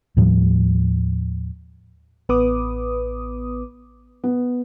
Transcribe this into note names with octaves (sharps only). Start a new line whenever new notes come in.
D#2 A2 F3 G3
A1 B3 B4 D6 D#6
B3